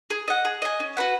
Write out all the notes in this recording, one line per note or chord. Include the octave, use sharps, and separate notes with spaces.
G#4
D#5 F#5
G#4
D#5 G#5
C#4
F#4 B4 F#5